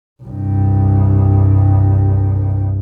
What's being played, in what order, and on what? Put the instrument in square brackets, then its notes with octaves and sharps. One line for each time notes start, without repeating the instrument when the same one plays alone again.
[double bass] C2 G2